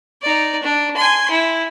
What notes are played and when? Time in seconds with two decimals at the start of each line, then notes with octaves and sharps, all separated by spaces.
0.21 D#4 D5
0.63 D4
0.97 G#5 C6
1.30 E4